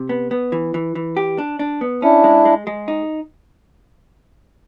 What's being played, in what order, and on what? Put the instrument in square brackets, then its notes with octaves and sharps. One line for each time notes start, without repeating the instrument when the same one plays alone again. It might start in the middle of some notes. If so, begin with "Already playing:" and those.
Already playing: [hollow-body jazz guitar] C3
B3
B3
E3
E3
E3
G4
D4
D4
B3
[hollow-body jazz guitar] C#4 [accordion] D4 E4
[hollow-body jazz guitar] G#3
G#3
G#3
D#4